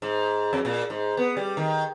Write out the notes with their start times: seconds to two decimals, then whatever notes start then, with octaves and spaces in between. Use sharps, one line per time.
0.02 G#2
0.53 F2
0.65 A#2
0.90 G#2
1.17 B3
1.37 G3
1.57 D#3